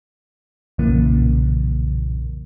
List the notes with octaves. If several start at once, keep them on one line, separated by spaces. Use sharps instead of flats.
B1 F2 A#2 C#3 E3 A#3